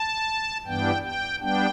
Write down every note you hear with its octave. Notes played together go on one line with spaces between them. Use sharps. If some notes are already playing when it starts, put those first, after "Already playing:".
Already playing: A5
G2 E3 B3 D4 G5
G5
G3 B3 D4 G5